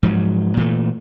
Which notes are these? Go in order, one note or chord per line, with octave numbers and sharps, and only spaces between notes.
G#2 F3 F#3
A#2 E3 A3